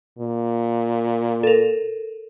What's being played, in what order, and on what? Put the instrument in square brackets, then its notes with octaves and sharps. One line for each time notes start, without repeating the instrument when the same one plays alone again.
[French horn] A#2
[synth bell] A4 A#4